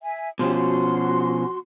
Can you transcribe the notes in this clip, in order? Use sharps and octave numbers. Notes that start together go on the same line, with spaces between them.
E5 G#5
B2 F3 C#4 G4 C6
F#4 C6